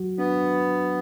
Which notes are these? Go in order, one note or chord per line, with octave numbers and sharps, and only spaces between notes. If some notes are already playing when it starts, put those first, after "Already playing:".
Already playing: F#3 F#4
B3 D4